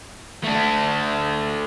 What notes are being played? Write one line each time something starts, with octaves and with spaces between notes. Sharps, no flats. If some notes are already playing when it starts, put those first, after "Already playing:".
A3 D4